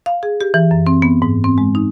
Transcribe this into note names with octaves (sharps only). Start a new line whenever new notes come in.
F5
G#4
G4
E3
F#2
C4
B3
G#2
C4
G#3
D#4